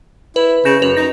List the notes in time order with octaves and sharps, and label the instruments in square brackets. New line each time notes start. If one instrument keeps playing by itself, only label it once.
[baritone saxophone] E4 [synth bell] B4
[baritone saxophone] C#3 [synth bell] G6 A#6 E7
[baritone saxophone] F#2 [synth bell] B4 F7
[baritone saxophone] D#4 [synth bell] A#6